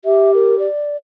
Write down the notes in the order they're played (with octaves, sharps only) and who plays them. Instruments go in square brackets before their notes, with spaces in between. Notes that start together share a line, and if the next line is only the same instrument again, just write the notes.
[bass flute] G4 [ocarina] E5
[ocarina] A#4
D5